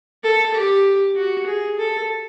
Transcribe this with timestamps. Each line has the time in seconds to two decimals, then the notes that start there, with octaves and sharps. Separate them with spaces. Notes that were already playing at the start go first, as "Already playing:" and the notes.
0.23 A4
0.54 G4
1.16 F#4
1.46 G#4
1.78 A4